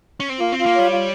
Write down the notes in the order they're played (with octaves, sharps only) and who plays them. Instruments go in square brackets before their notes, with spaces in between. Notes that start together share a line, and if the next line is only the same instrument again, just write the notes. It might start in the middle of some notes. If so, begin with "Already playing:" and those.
[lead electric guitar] C#4
C4
[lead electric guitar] A#3 [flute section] F4
[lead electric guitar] C4 [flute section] F4
[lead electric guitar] A#3
[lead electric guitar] G3 [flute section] C#5
[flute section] F4